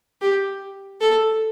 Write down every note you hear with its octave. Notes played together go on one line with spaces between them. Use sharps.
G4
A4